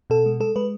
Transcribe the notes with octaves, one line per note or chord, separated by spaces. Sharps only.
B2 A4
G#3
G#3 A4
G#3 B4